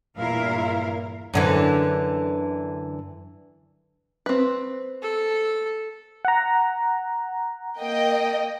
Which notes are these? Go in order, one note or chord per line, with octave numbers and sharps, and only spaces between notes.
E2 G2 A#2 E4 A#4 F5
F#2 D3 E3
C4 B4
A4
F#5 A#5
A#3 D#5 G5